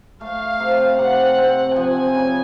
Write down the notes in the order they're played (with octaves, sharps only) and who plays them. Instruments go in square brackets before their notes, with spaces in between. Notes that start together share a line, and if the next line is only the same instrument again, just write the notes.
[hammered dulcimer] A3 [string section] F5
[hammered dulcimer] C3
[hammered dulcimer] C3 [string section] F#5
[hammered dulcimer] C4
[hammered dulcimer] F3 [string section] G#5
[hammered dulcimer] C#3